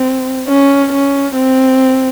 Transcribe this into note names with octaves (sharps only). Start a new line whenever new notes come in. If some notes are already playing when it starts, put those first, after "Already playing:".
Already playing: C4
C#4
C#4
C4